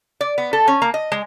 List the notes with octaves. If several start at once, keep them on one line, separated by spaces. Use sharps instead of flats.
D5
B3
A4
C#4
A#3
D#5
G#3